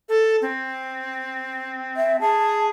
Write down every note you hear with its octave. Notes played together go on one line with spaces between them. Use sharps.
A4
C4
E5
G#4 A5